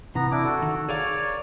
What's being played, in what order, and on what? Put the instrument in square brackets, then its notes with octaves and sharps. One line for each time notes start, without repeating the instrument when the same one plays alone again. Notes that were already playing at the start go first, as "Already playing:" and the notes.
[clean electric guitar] C3 E3 [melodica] B3 A#5
[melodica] D4 E4 D6
F#4 A4
[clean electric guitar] D#3
[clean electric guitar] G#4 A#4 F5 [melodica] C#5 D5